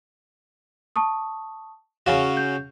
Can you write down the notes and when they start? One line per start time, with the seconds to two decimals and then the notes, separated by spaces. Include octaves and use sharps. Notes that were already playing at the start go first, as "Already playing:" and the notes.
0.96 A5 C#6 D#6
2.06 C#3 C#4 F#4 F5
2.37 G6